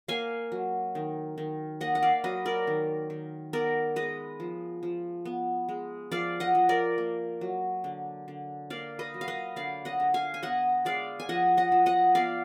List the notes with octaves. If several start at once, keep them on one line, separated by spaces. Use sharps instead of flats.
A#3 F5 G#5
F#3
D#3
D#3
A#3 D#5 F#5
F#5
D5 F5
F#3 B4 D#5
A#4 D5
D#3
D#3
B3 A#4 D5
G#3 B4 D#5
F3
F3
B3
G#3
F3 D5 F5
D#5 F#5
F3
A#4 D5
A#3
F#3
D3
D3
A#3 D5 F5
B4 D#5
F#3
F5
B4 D#5
D3 D5 F5
D#5 F#5
D3
F5 G#5
G#5
B3 D#5 F#5
G#3 D5 F5
G#5
F3 D#5 F#5
D#5 F#5
F3
D#5 F#5
B3 D5 F5